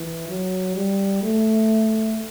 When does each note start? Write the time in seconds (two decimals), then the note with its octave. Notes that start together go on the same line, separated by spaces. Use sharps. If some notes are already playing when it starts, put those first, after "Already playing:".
Already playing: E3
0.29 F#3
0.76 G3
1.23 A3